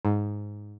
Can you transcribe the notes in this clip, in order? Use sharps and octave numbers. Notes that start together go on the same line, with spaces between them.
G#2